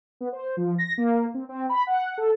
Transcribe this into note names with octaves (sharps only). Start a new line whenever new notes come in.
B3
C5
F3
A#6
A#3
C4
C4
B5
F#5
A4